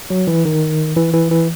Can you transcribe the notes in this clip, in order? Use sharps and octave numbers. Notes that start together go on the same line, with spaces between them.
F#3
E3
D#3
E3
E3
E3